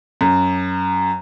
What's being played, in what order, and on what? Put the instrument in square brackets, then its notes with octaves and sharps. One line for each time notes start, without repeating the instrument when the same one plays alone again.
[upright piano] F#2